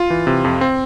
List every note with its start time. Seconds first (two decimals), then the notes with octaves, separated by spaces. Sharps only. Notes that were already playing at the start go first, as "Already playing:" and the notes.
Already playing: F4
0.10 E3
0.27 C3
0.44 F2
0.61 C4